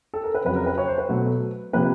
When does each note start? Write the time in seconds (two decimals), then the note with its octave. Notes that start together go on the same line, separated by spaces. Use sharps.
0.14 A4
0.23 A#4
0.34 B4
0.44 F2 C#3 F#3 B4
0.56 A#4
0.66 B4
0.78 C#5
0.88 C5
0.98 B4
1.09 B2 F#3 A3
1.73 C3 F3 A#3 B4